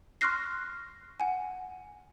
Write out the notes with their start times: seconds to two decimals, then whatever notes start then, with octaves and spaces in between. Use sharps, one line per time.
0.21 C6 C#6 F6 F#6 A#6 C7
1.20 F#5 G#5